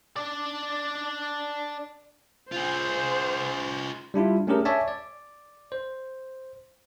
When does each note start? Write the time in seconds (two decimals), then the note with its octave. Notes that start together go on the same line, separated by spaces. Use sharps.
0.16 D4 D5
2.52 F4 G#4 C5
4.14 G3 D4 E4 F4
4.47 A3 C#4 D4 G4 G#4 A#4
4.65 C#5 D5 E5 G#5 A5
4.88 D5
5.72 C5